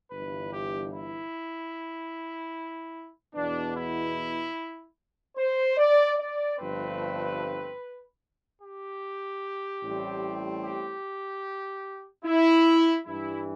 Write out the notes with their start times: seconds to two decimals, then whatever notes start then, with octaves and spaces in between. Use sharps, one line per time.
0.11 G1 G2 E3 B4
0.51 G4
0.91 E4
3.34 E2 B2 B3 D4
3.75 E4
5.36 C5
5.77 D5
6.18 D5
6.58 G1 G2 F3 A3 C4 B4
8.61 G4
9.82 A1 A2 G3 C4
10.63 G4
12.25 E4
13.06 G2 E3 G3 E4